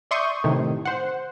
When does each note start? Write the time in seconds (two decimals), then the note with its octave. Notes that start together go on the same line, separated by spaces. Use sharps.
0.11 D5 E5 C6 C#6 D#6 G6
0.44 A2 C3 D#3
0.85 C5 F#5